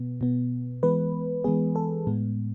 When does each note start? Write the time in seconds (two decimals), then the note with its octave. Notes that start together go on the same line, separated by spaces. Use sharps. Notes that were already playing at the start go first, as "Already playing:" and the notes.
Already playing: B2 B3
0.21 B2 B3
0.83 E3 G#3 B3 B4
1.44 E3 G#3 B3 G#4
1.76 A4
2.07 A2 G#3 B3